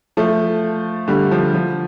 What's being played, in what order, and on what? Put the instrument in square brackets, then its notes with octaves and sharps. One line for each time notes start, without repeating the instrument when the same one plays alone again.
[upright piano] F3 A3
D3 G3
F3
F3